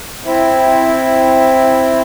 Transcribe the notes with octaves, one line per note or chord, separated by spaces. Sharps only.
C4 E4